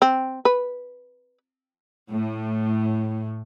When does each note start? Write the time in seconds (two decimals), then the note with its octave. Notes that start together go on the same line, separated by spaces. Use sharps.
0.02 C4
0.45 B4
2.11 A2